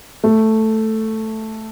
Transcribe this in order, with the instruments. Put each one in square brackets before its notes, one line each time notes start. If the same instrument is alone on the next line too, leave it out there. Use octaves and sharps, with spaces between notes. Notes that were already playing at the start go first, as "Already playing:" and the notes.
[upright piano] A3